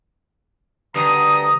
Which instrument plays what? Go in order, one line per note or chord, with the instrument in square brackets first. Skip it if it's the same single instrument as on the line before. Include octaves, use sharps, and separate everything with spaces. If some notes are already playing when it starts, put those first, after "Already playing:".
[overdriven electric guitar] D2 [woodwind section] G2 A#5 D#6